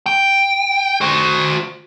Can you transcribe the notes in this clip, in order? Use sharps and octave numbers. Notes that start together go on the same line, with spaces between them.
G5
F#4 C5